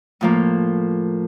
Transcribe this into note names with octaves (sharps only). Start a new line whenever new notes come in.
A2 F3 A#3